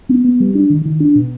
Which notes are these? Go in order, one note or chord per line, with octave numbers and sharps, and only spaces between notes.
B3
B3
G3
D4
D#3
D#3
D4
B2